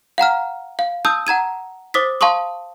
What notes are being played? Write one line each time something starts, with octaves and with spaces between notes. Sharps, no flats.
F5 F#5 A#5 F6
F5
A5 D#6 E6 G6
F#5 A#5 G#6 D#7
C5 D6 D#6 A6 B6
F5 A5 C6 C#6 D#6